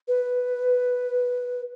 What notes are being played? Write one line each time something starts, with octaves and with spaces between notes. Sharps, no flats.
B4